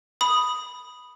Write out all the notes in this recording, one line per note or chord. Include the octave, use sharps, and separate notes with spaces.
B5 D#6